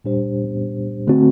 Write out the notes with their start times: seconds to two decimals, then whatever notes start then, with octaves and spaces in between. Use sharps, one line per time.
0.04 A#2 G3 D4 G4 C5
1.07 D3 A3 C4 F#4